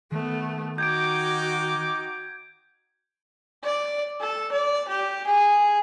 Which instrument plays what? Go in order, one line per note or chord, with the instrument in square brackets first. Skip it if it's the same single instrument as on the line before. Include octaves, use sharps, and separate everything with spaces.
[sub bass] D#3 [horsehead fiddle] A3 B3
[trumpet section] D#4 G5 D6 [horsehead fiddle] F#4 [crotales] G6 G#6 D7
[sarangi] D5
A4
D5
G4
G#4